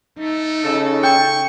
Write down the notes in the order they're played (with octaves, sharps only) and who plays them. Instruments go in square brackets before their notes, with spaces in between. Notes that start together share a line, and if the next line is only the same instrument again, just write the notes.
[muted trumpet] A3 [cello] D#4
[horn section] C#3 A4
[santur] G5 [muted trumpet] C#6